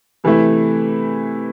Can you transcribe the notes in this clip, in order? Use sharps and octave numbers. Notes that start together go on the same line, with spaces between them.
C3 E3 A3 E4